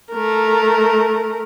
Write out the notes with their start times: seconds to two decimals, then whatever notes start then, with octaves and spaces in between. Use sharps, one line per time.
0.12 A3 A#4